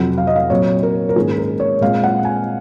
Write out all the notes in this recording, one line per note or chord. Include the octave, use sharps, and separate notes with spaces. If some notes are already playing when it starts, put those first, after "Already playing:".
Already playing: F2 C3 F#3 F#5
F5
D#5
F5
A#2 F#3 C4 C#5
A#4
A#4
G#2 D#3 A#3 C#4 G#4
A#4
C#5
A#2 G#3 C4 F5
F#5
G#5